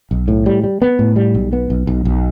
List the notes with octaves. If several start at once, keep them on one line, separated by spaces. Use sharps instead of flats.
B1
A2
G3
G3
B3
A2
G3
B1
B3
B1
B1
B1